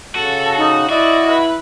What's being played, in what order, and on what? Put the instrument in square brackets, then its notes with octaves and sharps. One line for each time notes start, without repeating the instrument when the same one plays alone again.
[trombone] C#3 [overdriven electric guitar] F#4 [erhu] A4
[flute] D#4
[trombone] E4 [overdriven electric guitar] F#4 [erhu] D5 [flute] D#5
[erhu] B4